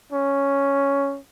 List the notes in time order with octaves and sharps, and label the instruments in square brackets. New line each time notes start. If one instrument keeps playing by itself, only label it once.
[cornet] C#4